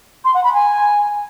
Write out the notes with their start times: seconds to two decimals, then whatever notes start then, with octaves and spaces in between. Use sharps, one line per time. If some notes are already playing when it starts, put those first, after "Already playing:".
0.24 C6
0.34 F#5
0.43 B5
0.53 G#5